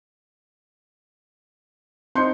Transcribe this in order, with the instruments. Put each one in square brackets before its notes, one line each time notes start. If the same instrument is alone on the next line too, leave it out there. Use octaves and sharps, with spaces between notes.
[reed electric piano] C4 D#4 [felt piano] C6 G6 C#7